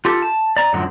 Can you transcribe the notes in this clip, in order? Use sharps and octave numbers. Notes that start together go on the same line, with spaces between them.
F4 G4 A4
A5
D5 A#5
F#2 A2 D3 F3 F#3